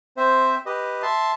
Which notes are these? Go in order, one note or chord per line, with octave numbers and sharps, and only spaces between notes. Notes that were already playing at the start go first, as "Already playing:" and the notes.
C4 C5 E5
G4 B4 D#5
E5 A5 C6